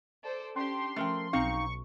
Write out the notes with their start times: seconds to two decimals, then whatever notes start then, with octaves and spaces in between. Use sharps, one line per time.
0.24 A4 C5 D5
0.56 C#4 D4 G4 C6 C#6
0.96 F3 A3 C#4 A#4 G5
1.33 B1 C4 D#4 F5 A#5 C#6